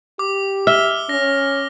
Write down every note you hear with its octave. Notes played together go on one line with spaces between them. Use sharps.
G4 D6
E5 F6 G7
C#4 A#6